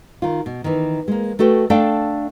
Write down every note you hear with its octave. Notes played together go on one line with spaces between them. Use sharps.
D#3 F4
B2
D#3 E3
G#3 A#3
A3 F#4 A4 B4 G5
A3 D4 A4 D5 F5 G5